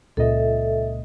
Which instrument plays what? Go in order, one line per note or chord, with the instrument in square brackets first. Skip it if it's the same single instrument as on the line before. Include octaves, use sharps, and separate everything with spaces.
[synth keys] C#2 A#2 D#5 [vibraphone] A4 E5